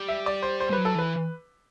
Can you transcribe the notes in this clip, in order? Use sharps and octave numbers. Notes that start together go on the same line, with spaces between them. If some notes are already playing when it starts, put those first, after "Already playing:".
Already playing: G3
E5
D5
C5
C5
G3 B4
F#3
A4
E3 B4